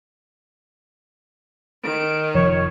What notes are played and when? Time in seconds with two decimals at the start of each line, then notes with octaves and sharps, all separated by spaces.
1.83 D#3 D7
2.34 F1 F3 C#5